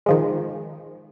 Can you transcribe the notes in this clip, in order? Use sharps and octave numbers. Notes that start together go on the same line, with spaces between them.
D#3 F3 G#3